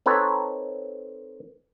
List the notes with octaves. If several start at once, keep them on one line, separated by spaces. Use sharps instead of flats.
C4 D#4 A4 B4 C#5